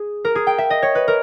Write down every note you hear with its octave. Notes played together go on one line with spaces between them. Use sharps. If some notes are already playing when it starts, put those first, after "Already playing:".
Already playing: G#4
A#4
G#4
G5
E5
D#5
C#5
B4
A#4